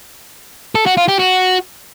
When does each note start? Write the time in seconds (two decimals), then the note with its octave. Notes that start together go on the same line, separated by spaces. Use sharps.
0.75 A4
0.86 F#4
0.97 F4
1.08 G4
1.19 F#4